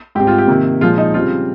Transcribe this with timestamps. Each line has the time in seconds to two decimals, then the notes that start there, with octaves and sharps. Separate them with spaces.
0.15 G#2 G3 C4 G4
0.27 F4
0.38 G4
0.48 C3 D#3 A#3
0.81 A#2 F3 G#3 F4
0.98 D#4
1.14 C#3 G3 C4 F4